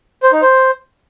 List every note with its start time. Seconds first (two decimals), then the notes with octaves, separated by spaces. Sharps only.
0.23 C5
0.32 D#4
0.42 C5